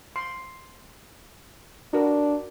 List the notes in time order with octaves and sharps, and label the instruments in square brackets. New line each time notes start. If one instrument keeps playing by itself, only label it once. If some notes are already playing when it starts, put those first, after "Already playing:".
[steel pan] C6
[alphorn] D4 [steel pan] F#4 A#4 B4